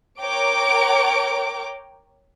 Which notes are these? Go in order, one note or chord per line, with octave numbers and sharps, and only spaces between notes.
A#4 C#5 G5 A#5 D6 D7